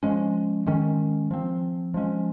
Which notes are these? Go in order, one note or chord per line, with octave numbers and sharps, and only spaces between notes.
F3 G#3 C#4
D#3 G#3 C#4
F3 C4
F3 G#3 C#4